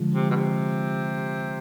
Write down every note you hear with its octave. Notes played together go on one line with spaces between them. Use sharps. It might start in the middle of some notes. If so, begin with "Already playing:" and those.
Already playing: D3 F3 G#3
C3
B2
C3